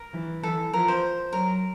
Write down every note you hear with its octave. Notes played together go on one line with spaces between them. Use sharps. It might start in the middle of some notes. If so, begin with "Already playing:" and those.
Already playing: A#4
E3
E3 A4
F3 A#4
C5
F#3 A#4